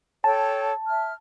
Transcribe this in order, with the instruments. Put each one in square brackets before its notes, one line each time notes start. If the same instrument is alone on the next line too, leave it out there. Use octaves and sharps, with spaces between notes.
[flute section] A4 C#5 G5 [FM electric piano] A5
[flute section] E5 F6